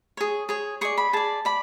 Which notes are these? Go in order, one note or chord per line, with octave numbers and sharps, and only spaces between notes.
G#4 C#5
G#4 C#5
G#4 D5 C#6
B5
G#4 D5 A5
D5 B5